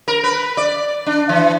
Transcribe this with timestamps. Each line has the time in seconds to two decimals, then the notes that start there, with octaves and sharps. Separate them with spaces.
0.08 A#4
0.23 B4
0.57 D5
1.06 D4
1.29 E3